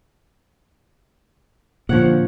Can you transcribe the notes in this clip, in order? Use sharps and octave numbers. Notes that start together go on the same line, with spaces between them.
A#2 D3 F3 C#5 F#5